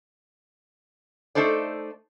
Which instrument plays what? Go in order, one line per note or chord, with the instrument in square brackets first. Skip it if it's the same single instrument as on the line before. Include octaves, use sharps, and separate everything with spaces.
[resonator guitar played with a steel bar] A3 D#4 A4 C5 D5